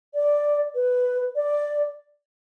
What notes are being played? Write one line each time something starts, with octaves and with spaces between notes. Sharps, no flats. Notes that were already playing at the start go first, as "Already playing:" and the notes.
D5
B4
D5